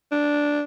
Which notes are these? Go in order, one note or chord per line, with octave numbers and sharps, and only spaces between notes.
D4